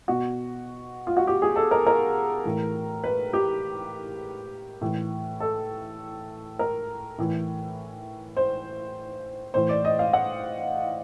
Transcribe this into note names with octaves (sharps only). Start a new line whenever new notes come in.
B2 F#4
F4
F#4
G4
G#4
A4
A#4
A#4
A2 E3
B4
G4
A2 E3
A4
A#4
A2 E3
C5
A2 E3 C5
D5
D#5
F5
F#5